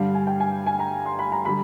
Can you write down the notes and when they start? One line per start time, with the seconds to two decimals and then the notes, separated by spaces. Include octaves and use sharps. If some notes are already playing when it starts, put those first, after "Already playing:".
Already playing: G2 D3 G3 F5
0.15 G#5
0.27 G5
0.40 G#5
0.66 G#5
0.79 A#5
1.06 C6
1.19 B5
1.32 A#5
1.45 D3 G3 B5